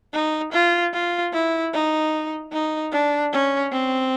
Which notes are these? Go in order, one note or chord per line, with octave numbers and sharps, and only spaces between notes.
D#4
F4
F4
E4
D#4
D#4
D4
C#4
C4